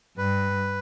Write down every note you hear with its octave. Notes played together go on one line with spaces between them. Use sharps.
G2 B4